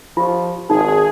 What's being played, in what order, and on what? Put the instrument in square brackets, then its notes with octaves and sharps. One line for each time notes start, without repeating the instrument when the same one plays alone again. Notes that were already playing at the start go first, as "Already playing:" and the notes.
[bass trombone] F3 [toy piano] F4 G4
[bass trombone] G#1 [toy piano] D#4 [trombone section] G#4